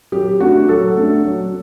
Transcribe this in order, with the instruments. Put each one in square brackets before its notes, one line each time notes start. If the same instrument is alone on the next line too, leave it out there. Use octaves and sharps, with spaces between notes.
[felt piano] F#3 G4
A3 D4 F#4
F#3 A4
A3 D4
F#3